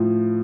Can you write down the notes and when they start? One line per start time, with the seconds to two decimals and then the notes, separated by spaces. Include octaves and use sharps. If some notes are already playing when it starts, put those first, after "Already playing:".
Already playing: A2 F3